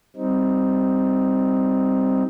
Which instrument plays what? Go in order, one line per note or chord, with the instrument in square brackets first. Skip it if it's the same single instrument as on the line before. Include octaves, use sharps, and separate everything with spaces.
[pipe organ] G3 C4 D#4